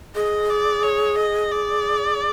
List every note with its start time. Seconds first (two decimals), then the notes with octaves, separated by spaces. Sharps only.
0.15 G#4 D#5
0.49 D5
0.83 C#5
1.18 D#5
1.51 D5